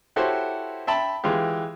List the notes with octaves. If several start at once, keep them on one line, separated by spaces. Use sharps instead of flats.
E4 F#4 G4 A4 C5 C#5
E5 G5 A5 B5
E3 G#3 F4 G4